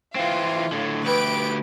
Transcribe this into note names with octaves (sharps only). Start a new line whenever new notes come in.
E3 C4 F4
A2 D3
D2 G4 B4 D7